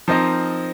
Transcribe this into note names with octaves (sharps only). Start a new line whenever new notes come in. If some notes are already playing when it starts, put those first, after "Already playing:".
F3 C4 D#4 A#4 D#5